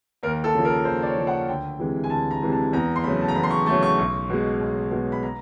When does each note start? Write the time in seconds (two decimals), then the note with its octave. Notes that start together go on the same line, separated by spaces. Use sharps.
0.23 D#2 A#4
0.44 A4
0.55 C#3 F3
0.65 A#4
0.85 D#2 C5
1.02 D5
1.06 C#5
1.17 C#3 F3
1.27 F#5
1.48 D2 G5
1.79 C3 E3 G#3
2.04 G#5
2.10 D2 A5
2.31 A#5
2.42 C3 E3 G#3
2.52 A5
2.73 E2 A#5
2.96 C6
3.04 C#3 F#3 A3 B5
3.21 A5
3.28 A#5
3.35 E2 B5
3.43 C6
3.51 C#6
3.66 C#3 F#3 A3 C#6
3.83 C#6
3.98 B1
4.30 B2 G#3
4.61 B1
4.91 B2 G#3
5.12 B5
5.23 A#5